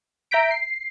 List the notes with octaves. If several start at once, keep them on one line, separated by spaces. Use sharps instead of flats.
E5 A#5 G6 B6 D7
C7